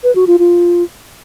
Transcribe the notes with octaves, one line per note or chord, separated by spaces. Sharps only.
B4
F#4
F4
F4